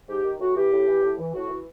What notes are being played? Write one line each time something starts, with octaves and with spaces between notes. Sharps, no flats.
G#2 G4
D#3
A2 F#4
E3 G4
A2
E3
A2
E3
A2 F#4
E3